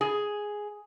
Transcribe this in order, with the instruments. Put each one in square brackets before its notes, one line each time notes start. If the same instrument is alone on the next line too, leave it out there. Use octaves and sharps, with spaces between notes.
[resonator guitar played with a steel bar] G#4